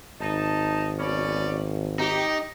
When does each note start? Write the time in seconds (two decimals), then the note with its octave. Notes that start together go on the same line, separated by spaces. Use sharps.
0.20 G#1 D#4 A5
0.99 B2 C#4 D5
1.99 D#4 G4